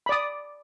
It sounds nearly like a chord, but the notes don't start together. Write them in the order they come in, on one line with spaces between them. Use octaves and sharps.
B5 D5 D#6